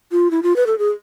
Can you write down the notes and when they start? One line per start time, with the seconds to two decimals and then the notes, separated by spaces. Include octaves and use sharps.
0.12 F4
0.31 E4
0.43 F4
0.56 B4
0.67 A4
0.79 G#4